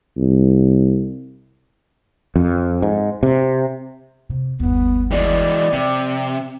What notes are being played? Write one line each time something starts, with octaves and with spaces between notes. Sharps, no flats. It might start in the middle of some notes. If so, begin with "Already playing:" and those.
C2
F2
G#2
C3
C3
G1 D#2 B3
E3 G#3 D5
C3 F3